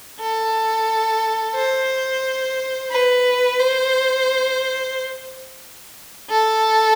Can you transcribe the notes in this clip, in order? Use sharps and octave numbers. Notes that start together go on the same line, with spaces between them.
A4
C5
B4
C5
A4